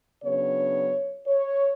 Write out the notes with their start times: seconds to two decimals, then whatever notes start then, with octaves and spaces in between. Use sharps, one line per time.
0.23 C#3 F#3 B3 D4 C#5
1.27 C#5